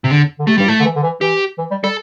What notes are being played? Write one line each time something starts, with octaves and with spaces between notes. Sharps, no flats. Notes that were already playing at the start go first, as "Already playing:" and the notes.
C3
E2 D3
D3
C3 A3
G2 G3
A2
A3
D3
E3
D3
E3
E3 G4
E3
G3
G3 A4